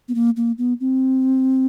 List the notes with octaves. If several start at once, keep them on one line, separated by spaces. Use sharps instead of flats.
B3
A#3
A#3
B3
C4